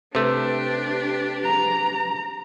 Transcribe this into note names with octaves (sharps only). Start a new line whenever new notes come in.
C3 A3 D4 G4 B4
A#5